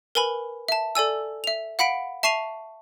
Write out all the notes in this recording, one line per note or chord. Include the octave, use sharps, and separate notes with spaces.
A#4 B4 G#5 B5
E5 A5
A4 D5 G#5 E6
E5 F7
F5 F#5 B5 B6 D7
E5 A5 C#6 C7 D#7 F7